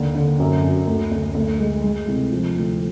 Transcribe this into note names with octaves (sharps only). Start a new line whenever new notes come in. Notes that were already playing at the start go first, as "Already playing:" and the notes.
Already playing: D#2 D3
D3
F#2
F#2
D2
D2
D2
G#3
G#3
C2
F3
D2